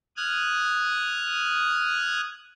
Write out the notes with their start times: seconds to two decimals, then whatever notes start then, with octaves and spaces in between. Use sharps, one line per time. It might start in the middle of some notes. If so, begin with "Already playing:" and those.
0.17 D#6 F6 F#6 G#6